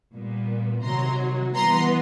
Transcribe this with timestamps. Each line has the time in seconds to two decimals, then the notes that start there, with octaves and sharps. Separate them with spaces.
0.13 A#2 G3 B3
0.84 C3 D#3 F#3 A#5 C6
1.55 E3 G3 B3 A#5 C6